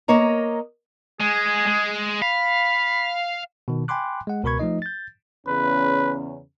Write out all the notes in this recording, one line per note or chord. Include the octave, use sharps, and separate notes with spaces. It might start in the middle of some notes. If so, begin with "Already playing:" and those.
A#3 C#5 D#5 A#5
G#3 G#4
G#3
F5 B5
B2 D#3
G5 G#5 B5 C6 D6 F#6
G#3 F#5
C#2 B2 A#4 B5 C#6 G#6
F3 A3 D#4 D#5
G6 A6
E2 C#3 C#4 B4